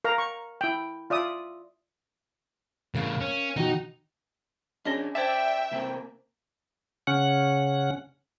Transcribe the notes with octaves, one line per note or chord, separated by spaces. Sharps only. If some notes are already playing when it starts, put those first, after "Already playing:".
A#4 F5 A#5
C#6
E4 G5
F4 D5 E5 D#6
A2 C#3 A#4 F5
C#4
B2 D#3 D#4 F#4
C#4 D4 G#4 C#5 D#5
C5 D5 E5 G5 A5
C3 A#3 C4
C#3 C#4 F#5